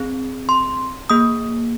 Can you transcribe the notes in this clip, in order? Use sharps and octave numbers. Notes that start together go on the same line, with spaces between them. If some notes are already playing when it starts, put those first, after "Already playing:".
Already playing: C4 G#4
C6
A#3 G#4 D#6